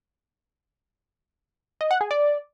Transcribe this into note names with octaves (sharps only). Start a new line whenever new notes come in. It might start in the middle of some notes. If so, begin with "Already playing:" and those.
D#5
F#5
G#4
D5